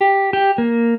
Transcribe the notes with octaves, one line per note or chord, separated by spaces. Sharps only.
G4
G4
A#3